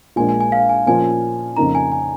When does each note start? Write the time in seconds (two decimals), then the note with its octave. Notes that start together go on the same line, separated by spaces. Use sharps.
0.16 A#1 A#2 G#3 F4 G#5
0.29 G#5
0.40 G#5
0.52 F5
0.69 G#5
0.87 A#2 F3 C#4 F4 G#5
1.56 F2 C#3 A#3 D#4 A#5
1.75 G#5
1.92 G#5